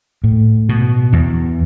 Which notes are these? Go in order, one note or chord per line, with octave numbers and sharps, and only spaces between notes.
A2
B2
E2